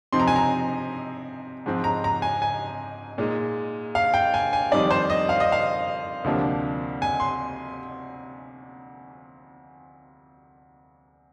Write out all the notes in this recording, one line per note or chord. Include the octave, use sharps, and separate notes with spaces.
C3 F3 C4 D#4 C6
A#5
G#5
A#5
G#2 F3 C4
A#5
A#5
G#5
G#5
A#2 G#3 D#4
F5
G5
G#5
G#5
F2 D#3 G3 C4 D#4 D5
C5
D#5
F5
D#5
F5
D2 C3 F3 A#3 D4
G#5
C6